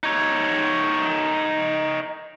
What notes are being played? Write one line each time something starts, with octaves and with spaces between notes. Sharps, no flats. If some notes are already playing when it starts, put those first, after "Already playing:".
D#4 C#5